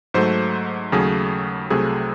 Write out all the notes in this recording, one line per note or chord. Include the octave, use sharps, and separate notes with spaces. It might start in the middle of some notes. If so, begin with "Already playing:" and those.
G#2 F#3 A3 C5
D#2 C#3 F#3 A3 G#4
C2 C3 F#3 A3 G#4